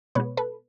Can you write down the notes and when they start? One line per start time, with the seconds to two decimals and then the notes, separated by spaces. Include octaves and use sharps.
0.15 B2 G#3 B3 B4 C#5
0.37 A4 B4